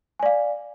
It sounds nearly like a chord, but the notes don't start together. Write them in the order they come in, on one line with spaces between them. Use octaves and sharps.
G#5 D5 F5